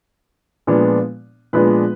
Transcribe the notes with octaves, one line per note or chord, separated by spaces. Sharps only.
A#2 F3 G#3 B3 D4
A#2 F3 G#3 B3 D4 B4